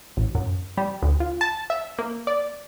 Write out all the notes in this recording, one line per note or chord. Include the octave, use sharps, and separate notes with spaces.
A1
F#2
G3
D2
F4
A5
E5
A#3
D5